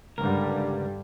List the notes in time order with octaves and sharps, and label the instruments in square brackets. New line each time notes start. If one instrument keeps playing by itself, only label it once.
[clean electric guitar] C#2 A#4 [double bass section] G2 D3 G3